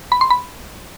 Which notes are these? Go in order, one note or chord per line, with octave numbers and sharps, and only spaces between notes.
B5
C6
B5